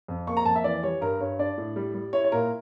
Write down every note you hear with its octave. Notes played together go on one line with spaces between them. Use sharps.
F2
A#3 C#6
A#5
F2 A5
E5
E3 D5
G3 C#5
G2 A#4
G2 C#5
D4 D5
A2
G3
G3
E4 C#5
C#5
A#2 A#4